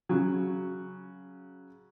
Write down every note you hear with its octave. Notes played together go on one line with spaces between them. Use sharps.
C#3 F#3